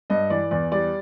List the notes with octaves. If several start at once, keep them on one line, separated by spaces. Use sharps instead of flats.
G2 D#5
E3 D5
E2 D5
G3 D5